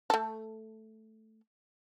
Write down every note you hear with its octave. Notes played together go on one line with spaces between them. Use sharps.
A3 A4